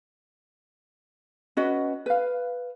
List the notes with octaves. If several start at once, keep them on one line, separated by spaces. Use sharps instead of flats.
C#4 F#4 B4 D#5
B4 F5